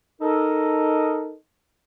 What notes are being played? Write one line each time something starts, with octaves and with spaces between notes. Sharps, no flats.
D#4 A4 A#4 D#5